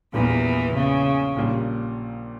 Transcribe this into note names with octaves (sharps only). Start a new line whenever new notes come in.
A#1 E2 A#2 E3 G3 A#3
C#3
A#1 A#2 G3